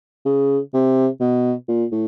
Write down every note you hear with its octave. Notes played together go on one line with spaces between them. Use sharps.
C#3
C3
B2
A#2
A2